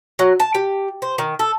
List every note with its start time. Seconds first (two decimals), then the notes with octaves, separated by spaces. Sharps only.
0.19 F#3
0.40 A5
0.55 G4
1.02 C5
1.18 D#3
1.39 A4